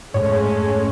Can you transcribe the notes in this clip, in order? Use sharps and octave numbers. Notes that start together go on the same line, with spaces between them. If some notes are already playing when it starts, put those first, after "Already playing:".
F2 G#2 G#3 A3 C#4 C#5